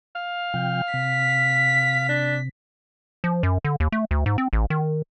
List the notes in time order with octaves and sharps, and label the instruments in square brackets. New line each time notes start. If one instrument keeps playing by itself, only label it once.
[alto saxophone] F5
[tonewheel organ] C3 F3 G5
[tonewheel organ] C3 [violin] B6
[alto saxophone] D4
[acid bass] F3
F#2
D3
D#2
A3
D2
G#2
C4
A1
D#3